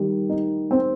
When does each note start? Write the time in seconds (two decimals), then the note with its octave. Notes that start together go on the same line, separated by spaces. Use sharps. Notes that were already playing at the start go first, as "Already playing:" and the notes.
Already playing: D#3 G3
0.30 D#4
0.71 C4